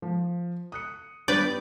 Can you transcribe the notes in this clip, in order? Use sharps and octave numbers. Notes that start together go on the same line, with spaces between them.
F3
D#6 F#6 C#7
G2 B3 G4 B4 D5 G6